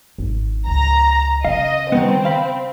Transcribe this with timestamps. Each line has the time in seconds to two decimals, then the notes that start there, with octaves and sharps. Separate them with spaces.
0.18 G#1
0.67 C#2 A#5
1.45 C#3 D#5 F5
1.92 D#3 G3 B3 C4
2.25 F5 B5